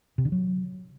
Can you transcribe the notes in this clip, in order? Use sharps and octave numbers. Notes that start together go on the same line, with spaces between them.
C3
D3
F#3